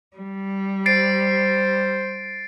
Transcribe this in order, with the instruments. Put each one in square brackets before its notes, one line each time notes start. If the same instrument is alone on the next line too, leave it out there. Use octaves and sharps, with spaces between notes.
[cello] G3
[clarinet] C5 [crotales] A6 C7 D7